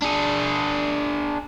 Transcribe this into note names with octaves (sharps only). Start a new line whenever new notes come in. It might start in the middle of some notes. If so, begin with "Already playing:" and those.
D4 G#4